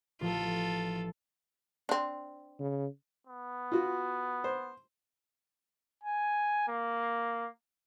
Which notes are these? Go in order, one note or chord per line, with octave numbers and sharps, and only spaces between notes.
A1 F3 F4 A4
C4 D4
C#3
B3
F4 F#4
C5
G#5
A#3